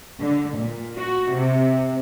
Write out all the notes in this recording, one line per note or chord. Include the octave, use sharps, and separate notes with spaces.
D3
A#2
F#4
C3